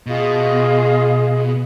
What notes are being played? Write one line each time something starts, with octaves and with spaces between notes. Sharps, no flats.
B2 F4 G#4 D#5